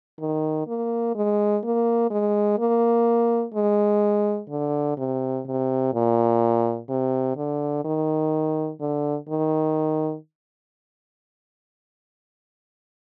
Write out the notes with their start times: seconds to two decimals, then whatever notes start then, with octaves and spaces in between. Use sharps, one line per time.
0.20 D#3
0.67 A#3
1.15 G#3
1.64 A#3
2.11 G#3
2.58 A#3
3.54 G#3
4.50 D3
4.97 C3
5.46 C3
5.94 A#2
6.89 C3
7.37 D3
7.85 D#3
8.81 D3
9.29 D#3